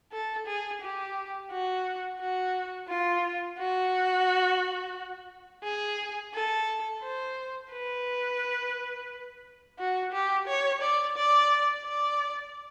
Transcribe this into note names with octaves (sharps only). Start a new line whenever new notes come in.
A4
G#4
G4
F#4
F#4
F4
F#4
G#4
A4
C5
B4
F#4
G4
C#5
D5
D5
D5